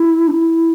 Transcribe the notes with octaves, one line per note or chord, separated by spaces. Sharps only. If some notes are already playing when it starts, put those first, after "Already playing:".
Already playing: E4
D4
E4